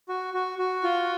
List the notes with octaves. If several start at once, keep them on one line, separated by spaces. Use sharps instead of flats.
F#4
F#4
F#4
F4